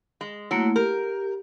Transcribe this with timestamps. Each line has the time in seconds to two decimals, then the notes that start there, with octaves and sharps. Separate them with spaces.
0.21 G#3
0.51 F#3 A3 A#3 E4
0.76 G4 A#4